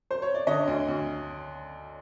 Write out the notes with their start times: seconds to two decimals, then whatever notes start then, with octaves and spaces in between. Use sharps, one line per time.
0.11 C5
0.22 C#5
0.34 D5
0.47 D3 C#5 D#5
0.68 D2
0.88 D2